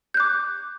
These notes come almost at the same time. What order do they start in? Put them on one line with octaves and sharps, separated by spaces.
G6 F#6 D6